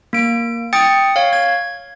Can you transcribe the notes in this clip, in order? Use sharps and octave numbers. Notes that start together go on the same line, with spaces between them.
A#3 D7
G5 D#6 A6 C#7
C#5 F5
G#6